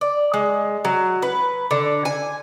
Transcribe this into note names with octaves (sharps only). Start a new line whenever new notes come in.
D5
G#3
F#3
B4
D3
G#5